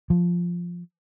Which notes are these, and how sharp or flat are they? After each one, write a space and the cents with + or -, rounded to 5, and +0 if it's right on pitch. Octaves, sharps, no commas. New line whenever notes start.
F3 +0